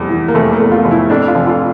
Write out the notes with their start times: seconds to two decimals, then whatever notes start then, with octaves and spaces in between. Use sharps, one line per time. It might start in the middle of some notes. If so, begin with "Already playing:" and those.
Already playing: F1 E2 G3
0.09 E3
0.28 A#3
0.35 F1 A3
0.53 A#3
0.60 E2
0.72 F4
0.85 F1
0.91 E4
1.10 F2 D4
1.28 F4
1.35 F1
1.47 F4